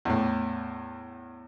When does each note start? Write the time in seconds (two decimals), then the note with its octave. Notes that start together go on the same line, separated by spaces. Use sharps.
0.05 E2 A2